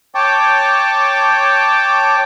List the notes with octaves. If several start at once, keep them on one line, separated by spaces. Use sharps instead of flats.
C#5 G5 A5 D6